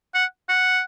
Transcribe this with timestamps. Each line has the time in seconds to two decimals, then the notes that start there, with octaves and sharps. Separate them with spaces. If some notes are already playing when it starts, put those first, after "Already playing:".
0.14 F#5
0.49 F#5